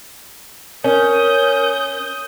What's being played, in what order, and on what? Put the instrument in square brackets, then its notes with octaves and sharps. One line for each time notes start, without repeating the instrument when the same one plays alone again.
[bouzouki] C#4 [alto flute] A#4 [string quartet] D#6 G6